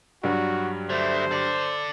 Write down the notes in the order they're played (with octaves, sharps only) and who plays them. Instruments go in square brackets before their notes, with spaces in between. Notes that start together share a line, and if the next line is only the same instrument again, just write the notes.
[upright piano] G2 F#3 G3 [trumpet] F#4
[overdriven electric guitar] D3 A3 [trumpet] C5
[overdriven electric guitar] A4 D5